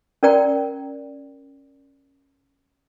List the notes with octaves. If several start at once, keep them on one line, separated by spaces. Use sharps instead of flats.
C#4 A#4 D5 G5 A#5